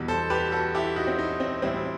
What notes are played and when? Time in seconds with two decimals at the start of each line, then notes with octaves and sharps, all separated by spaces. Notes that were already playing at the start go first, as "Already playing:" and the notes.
Already playing: E2 B2 G3
0.08 A4 C5
0.30 G4 B4
0.52 F#4 A4
0.75 E4 G4
0.96 D#4 F#4
1.07 C4
1.18 D#4
1.40 C4
1.62 A2 E3 G3 C4 E4